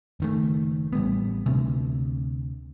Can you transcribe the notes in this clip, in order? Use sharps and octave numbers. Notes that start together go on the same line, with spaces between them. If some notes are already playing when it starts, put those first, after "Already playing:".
F#1 D#3 A3
A1 G3 B3
D2 C3